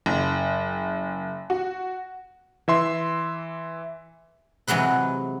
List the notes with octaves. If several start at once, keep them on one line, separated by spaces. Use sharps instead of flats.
F#1
F#4
E3 E5 C6
C3 E3 F#3 G#3 B4